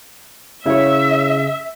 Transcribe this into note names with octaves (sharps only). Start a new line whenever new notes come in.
C#3 E4 G#4 C#5 E5